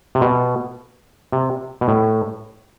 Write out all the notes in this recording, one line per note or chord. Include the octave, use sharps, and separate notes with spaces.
C3
B2
C3
B2
A2